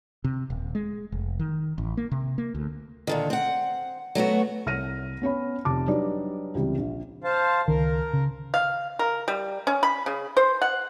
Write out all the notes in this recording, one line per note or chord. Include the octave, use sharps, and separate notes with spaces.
C3
D#1
G#3
F1
D#3
A1
A#3
C3
A#3
D2
A#2 D3 D#3
C4 F#5
F#3 A3 B3 F#4
C2 C#5 F6 A#6 D#7
B3 C#4 C#5 B5
F1 C3 A5 D6
F#3 G3 D4 D#4 B4 D5
C#2 C3 E3 G3
A#1
C5 F5 A5
C#2 D#3 A#4
C#3
F5
A#4
G3
C#4
B5
C#3
C5
F#5